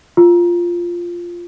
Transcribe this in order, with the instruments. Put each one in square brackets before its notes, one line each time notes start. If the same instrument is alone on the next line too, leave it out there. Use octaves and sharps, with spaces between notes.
[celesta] F4